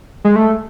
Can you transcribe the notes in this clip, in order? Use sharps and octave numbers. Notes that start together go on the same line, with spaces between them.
G#3
A3